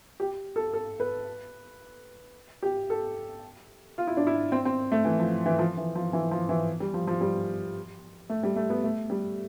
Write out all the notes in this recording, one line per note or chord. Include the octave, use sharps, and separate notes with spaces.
G4
A4
A4
B4
G4
A4
F4
E4
D4
E4
C4
C4
A3
E3
F3
E3
F3
E3
F3
E3
F3
E3
G3
F3
F3
G3
A3
G3
A3
B3
A3
G3